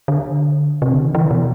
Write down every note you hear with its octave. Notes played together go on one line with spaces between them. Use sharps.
D3
C3
D3
D#3
E3
B2